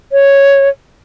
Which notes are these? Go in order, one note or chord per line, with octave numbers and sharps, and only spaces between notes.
C#5